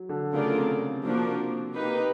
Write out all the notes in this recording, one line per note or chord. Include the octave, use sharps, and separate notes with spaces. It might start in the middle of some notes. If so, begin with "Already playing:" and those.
Already playing: F#3
D3
C#3 A3 D4 F4 A#4 D5
C3
C3 F3 A#3 D4 F#4 A#4
A#3 D#4 G4 B4